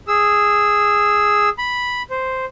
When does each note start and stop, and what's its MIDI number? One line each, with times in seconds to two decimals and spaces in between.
0.08 1.49 68
0.08 1.49 88
1.58 2.02 83
2.10 2.45 72